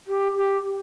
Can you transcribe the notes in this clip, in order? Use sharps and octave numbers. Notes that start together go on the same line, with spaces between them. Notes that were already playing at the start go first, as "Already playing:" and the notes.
G4
G4